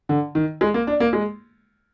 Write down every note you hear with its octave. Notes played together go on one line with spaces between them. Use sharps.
D3
D#3
G#3
A#3
D4
A#3
G#3